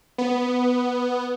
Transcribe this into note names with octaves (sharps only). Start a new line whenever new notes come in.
B3